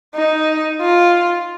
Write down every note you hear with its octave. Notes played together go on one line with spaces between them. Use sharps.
D#4
F4